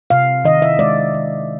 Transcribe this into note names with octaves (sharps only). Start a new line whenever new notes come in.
C3 F5
D#3 D#5
E5
G#3 D5
D#3